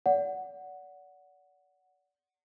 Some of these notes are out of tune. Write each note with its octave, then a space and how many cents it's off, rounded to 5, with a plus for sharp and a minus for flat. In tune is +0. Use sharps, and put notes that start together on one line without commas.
D5 -35 F#5 +0